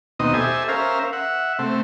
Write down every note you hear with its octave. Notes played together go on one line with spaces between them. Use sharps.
D#2 B2 C4 D#4 D#5
G4 A4 C5 E5 G#5
C#4 A#4 C5 E5 F5
E5 F#5
C3 A3 C4